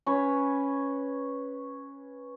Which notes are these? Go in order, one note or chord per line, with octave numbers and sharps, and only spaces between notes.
C#4 B4 C#5